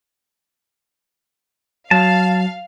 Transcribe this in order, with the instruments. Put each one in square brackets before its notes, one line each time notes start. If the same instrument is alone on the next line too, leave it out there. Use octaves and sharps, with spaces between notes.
[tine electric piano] F#3 [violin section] F5 [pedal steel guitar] A5